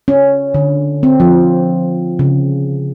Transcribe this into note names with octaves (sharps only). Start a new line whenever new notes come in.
C#4
D3
C4
F3
C#3